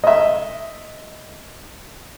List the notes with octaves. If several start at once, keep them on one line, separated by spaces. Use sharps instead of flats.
D#5 E5